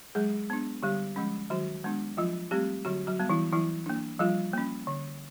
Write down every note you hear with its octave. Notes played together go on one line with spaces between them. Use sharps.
F#3 G#3 G#4
B3 D4
D3 G3 G4
F3 G#3 C#4
D#3 F#3 F#4
G#3 B3 D4
F3 F#3 F4
G3 A3 C4 G4
D3 F#3 F#4
F#3 F#4
G3 B3
E3 E4
E3 F#3 E4
A#3 D4
F3 G3 F4
A#3 C#4
D3